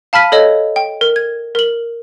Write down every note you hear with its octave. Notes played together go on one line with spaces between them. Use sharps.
F5 A5 B5 F6 B6 D#7
A4 C#5 D#5
G5
A#4
G#6
A#4 F#7